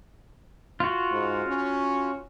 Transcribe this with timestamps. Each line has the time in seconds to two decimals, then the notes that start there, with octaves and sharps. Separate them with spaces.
0.80 F4 F#4
1.11 G#2
1.46 C#4